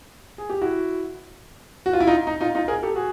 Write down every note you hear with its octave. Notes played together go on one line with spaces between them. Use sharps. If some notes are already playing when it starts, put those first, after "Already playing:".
G#4
G4
E4 F#4
F#4
F4
E4
D#4 F4
D#4
D#4 F4
D#4 F4
G#4 A#4
G4 A4
F#4 G#4